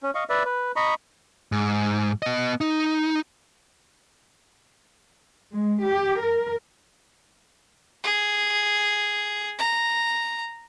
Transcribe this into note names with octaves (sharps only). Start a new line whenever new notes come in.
C#4
D#5 F5 C#6
B4 D5 E5
B4
D#5 A#5 B5 C#6
G#2
B3 D#5
D#4
G#3
G4
A#4
G#4
A#5